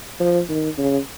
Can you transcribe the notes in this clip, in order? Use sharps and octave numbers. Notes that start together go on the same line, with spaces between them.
F3
D#3
C#3